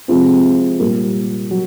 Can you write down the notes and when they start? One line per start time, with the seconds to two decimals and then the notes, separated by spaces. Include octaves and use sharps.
0.08 C3 F3 G#3 C4 F4
0.80 A#2 G3 A#3
1.51 F#3